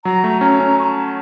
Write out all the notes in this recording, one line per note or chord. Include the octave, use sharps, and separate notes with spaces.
F#3 A#5
A3
C#4 A#5
C#4
C#6
A5